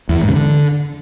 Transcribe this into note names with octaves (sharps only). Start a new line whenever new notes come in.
E2
E3
G#2
C#3
D3